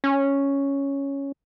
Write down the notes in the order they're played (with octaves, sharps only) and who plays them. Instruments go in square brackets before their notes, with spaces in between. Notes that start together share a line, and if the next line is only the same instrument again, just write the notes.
[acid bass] C#4